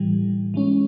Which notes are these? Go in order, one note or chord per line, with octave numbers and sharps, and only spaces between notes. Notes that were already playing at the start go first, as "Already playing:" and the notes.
Already playing: A2 E3 G3
E3 G#3 C#4